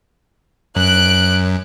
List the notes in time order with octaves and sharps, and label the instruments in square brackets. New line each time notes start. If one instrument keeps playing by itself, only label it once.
[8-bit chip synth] F#2 [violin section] F#6 D7